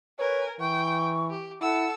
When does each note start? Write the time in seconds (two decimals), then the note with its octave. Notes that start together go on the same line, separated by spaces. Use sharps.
0.19 A#4 B4 C#5 G#5
0.60 E3 G5 C#6
1.30 G4
1.62 E4 A4 F#5 E6